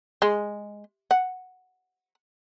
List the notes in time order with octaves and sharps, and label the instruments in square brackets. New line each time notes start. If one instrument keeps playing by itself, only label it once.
[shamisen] G#3
F#5